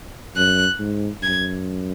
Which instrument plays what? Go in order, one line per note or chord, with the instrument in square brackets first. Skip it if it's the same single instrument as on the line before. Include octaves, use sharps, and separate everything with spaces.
[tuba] F#2 [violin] F#6
[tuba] G#2
[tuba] F#2 [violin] G#6